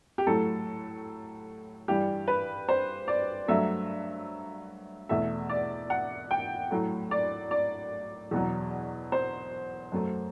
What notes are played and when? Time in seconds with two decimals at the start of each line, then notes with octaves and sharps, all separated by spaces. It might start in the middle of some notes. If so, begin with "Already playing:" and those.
0.18 G4
0.27 A2 F#3 A3 A4
1.88 G2 E3 G3 G4
2.28 B4
2.69 C5
3.08 D5
3.48 G2 F#3 A3 E5
5.09 E2 B2 A3 E5
5.49 D5
5.90 F#5
6.31 G5
6.71 A2 F#3 A3
7.11 D5
7.51 D5
8.31 E2 B2 F#3
9.12 C5
9.92 F#2 F#3 A3